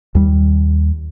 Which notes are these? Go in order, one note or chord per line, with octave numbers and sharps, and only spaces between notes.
D#2 G3